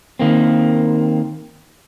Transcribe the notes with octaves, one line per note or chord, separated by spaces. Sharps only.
D#3 A#3 C4